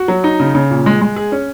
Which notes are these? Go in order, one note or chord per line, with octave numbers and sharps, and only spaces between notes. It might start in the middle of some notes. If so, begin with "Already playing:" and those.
Already playing: F#4
F#3
D#4
C#3
C#3
A#2
G#3
G#3
G#4
C#4